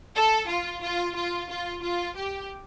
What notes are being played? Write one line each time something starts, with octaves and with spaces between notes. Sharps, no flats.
A4
F4
F4
F4
F4
F4
G4